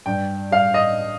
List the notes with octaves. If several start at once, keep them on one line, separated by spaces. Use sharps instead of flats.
G2 G5
G3 F5
D#5